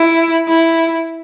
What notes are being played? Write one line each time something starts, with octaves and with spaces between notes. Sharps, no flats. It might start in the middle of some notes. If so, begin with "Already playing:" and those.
Already playing: E4
E4